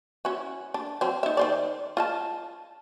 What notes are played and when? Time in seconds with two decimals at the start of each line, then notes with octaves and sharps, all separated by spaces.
0.25 C#4 E4 F#4
0.74 D4
1.01 F#3 C4 C#4
1.23 D#4 E5
1.37 D#3 C5 D5
1.97 F4 D#5 A5